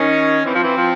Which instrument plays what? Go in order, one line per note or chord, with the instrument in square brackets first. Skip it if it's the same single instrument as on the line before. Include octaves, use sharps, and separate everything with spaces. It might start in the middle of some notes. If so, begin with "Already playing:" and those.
Already playing: [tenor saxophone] D#3 [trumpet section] C#4
[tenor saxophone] E3 [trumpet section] C4
[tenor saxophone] F3
E3
F3